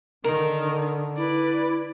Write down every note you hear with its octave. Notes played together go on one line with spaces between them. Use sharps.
D3 D#3 A#4
E4 B4 D5